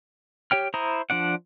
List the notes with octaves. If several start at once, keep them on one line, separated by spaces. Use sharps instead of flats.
G4 C#5 G5 F6
E4 C5 A#5 D#6
F3 D4 D5 F#5